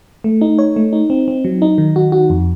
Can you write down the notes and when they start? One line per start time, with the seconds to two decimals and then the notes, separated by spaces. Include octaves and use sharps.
0.24 A3
0.41 D#4
0.59 C#5
0.76 A3
0.93 D#4
1.10 C4
1.28 C4
1.45 F#3
1.62 D#4
1.78 D#3
1.96 F#4
2.12 F#4
2.30 F2